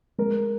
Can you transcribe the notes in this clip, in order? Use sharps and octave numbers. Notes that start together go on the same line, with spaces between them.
G#3 A#4